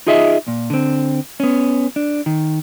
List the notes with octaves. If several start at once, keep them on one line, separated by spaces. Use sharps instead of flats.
D#4 F4 G#4 D#5 E5
A#2
D3 C4
B3 C#4
D4
D#3